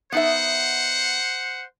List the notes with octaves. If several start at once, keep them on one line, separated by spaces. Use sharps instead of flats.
B3 D#4 C5 E5 F#5